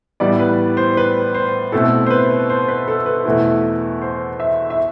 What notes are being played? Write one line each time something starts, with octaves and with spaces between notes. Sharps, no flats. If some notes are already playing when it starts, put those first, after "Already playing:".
A2 E3 G3 B3 D5
B4
C5
B4
C5
B2 A3 C4 E4 A4
C5
B4
C5
B4
A4
B4
E2 B2 A3 E4
C5
E5
E5